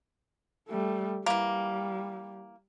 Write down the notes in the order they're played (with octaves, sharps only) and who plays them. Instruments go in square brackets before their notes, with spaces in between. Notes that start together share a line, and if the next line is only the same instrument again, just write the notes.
[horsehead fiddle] G3 A3
[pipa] E3 A#3 [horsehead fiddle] G3